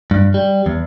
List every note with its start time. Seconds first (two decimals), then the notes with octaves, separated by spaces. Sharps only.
0.11 G2
0.34 G3
0.66 E2